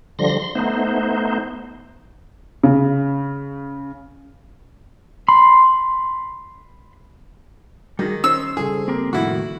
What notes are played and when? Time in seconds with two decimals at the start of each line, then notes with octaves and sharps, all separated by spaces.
0.19 D3 F3 G3 C6 A#6
0.40 C6
0.55 A3 B3 D#4 C5
2.64 C#3
5.28 B5 C6
7.99 D#3 G3 F#4 G#4
8.24 C#4 D#4 C5 E6
8.57 C#3 G3 G#4 A4
8.88 A#3 C4 G4 A#4
9.13 F2 A2 D#3 E4 F#4